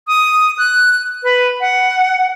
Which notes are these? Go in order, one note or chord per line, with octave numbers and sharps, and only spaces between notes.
D#6
F#6
B4
F#5